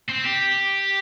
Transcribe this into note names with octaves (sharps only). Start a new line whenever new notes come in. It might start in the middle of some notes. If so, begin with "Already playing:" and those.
C4
G4